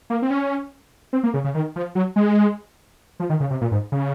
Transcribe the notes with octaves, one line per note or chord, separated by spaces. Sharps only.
A#3
C4
C#4
C4
A#3
C#3
C#3
D#3
F3
F#3
G#3
F3
D#3
C#3
C3
A#2
G#2
C#3